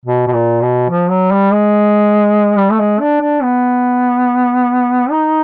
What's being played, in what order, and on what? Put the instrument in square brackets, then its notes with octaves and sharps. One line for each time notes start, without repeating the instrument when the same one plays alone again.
[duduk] B2
B2
A#2
B2
F3
F#3
G3
G#3
G3
A3
G#3
D4
D4
B3
D#4